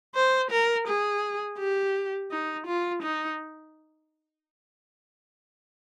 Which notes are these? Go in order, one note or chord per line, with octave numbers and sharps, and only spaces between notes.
C5
A#4
G#4
G4
D#4
F4
D#4